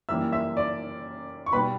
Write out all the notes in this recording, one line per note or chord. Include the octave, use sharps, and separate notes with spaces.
F#2 E3 G3 A#3 E5 E6
E5 E6
D5 D6
C#6
B2 G3 B3 B4 B5